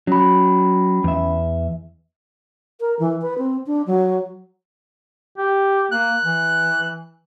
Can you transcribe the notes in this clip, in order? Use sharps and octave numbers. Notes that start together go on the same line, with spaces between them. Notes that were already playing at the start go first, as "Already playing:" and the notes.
F#3 C#4 B5
E2 E5
A#4
E3
B4
C4
D4
F#3
G4
A#3 F#6
E3